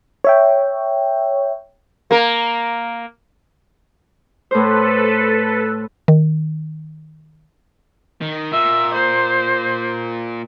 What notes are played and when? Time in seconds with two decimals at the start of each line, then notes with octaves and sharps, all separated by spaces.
0.24 C#5 E5 G5
2.11 A#3 A#4
4.51 A2 A4 B4 C5
6.08 D#3
8.21 D#3
8.52 A#2 E5
8.94 C5